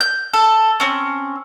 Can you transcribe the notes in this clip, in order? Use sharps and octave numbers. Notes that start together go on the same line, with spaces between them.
G6
A4
C4 C#4